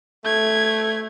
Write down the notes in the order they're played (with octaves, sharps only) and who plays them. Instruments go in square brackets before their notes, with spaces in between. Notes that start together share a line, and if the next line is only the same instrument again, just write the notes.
[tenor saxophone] A3 [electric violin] G#6